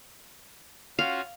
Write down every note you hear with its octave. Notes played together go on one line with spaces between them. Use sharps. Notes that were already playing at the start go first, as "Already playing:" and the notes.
C#4 F4 F#4 F5